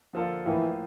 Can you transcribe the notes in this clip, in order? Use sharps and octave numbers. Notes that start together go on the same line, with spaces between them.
D3 F3 A#3 F4 A4
A2 E3 F3 A#3